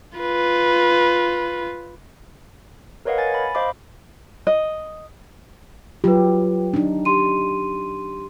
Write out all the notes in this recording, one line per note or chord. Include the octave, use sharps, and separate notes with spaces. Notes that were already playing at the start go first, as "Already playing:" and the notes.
F4 B4
A#4 B4 C#5 D#5 F5 F#5
G#5 A6
B5
C5 D#5 F5 B5 D6
D#5
F#3 F4 G4 B4
D4 D#4
G4 C6 D#7